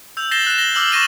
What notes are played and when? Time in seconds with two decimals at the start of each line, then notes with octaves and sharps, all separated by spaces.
0.17 E6 G6 F7
0.31 G6 A6 A#6 C7 E7 G7
0.47 F#6 E7
0.58 A#6 G7
0.75 D6 E6 F6 F#7
0.91 C#6 A6 A#6 D#7 E7 G7